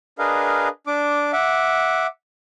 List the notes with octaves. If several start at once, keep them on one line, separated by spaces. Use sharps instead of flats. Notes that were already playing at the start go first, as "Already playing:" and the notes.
D4 G#4 A#4 B4 D#5 F5
D4 D6
E5 F#5 D6